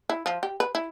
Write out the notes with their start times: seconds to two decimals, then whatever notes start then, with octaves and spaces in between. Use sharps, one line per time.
0.09 E4
0.26 F3
0.43 G4
0.60 B4
0.75 E4